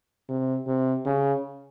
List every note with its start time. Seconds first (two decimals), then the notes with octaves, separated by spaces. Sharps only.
0.29 C3
0.67 C3
1.06 C#3